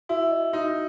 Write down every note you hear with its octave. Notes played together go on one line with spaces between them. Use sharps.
E4 F#4
D#5
D#4 F#4